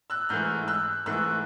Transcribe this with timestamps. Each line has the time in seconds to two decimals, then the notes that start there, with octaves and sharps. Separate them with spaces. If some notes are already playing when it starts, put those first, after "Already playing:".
0.10 E6 F#6
0.29 G#2 E3 A3 F6 G6
0.68 E6 F#6
1.06 G#2 E3 A3 E6 F#6